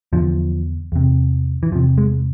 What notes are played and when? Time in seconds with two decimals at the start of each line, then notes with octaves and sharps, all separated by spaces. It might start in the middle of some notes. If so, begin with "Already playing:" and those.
0.13 E2 D3 F3
0.92 E2 C3
1.63 E3
1.72 E2 F3
1.75 C3
1.98 G#3